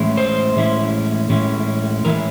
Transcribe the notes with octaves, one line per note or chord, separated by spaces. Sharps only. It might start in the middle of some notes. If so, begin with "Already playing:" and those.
Already playing: A2 E3 G#3 C#4 E4
C5
A2 E3 G#3 C#4 E4
A2 E3 G#3 C#4 E4
A2 E3 G#3 C#4 E4 A#4